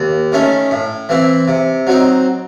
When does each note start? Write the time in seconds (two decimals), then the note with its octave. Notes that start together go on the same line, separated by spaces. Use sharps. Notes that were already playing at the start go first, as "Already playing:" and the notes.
Already playing: D#2
0.32 D#3 A3 C#4
0.71 A2
1.09 E3 C4 E4
1.48 C3
1.87 F#3 C4 D#4